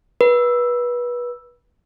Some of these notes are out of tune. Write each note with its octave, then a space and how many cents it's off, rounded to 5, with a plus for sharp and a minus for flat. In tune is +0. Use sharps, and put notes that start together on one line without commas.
B4 -25